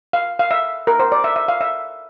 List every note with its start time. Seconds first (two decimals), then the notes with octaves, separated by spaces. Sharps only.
0.13 F5
0.39 F5
0.51 E5
0.87 A#4
0.99 C5
1.12 D5
1.24 E5
1.36 E5
1.48 F5
1.61 E5